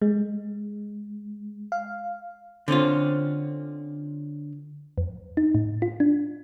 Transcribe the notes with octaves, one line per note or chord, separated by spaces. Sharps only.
G#3
F5
D3 C4 C#4 F4
F2
D#4
A2
F4
D4